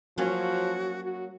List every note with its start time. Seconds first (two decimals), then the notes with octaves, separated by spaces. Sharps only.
0.18 F3 F#3 A#3 C#4 F#4
1.02 F#4